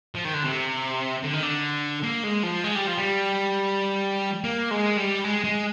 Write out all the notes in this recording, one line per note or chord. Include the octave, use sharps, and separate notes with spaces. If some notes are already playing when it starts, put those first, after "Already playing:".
F3
D#3
D3
C3
D3
D#3
D3
A#3
G#3
F3
G#3
G3
F3
G3
A#3
G#3
G3
G#3
G#3